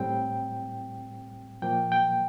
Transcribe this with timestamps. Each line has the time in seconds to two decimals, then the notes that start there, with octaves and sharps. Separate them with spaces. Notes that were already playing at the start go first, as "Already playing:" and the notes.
Already playing: A2 G3 C4 G5
1.62 A#2 F3 A#3 G5
1.92 G5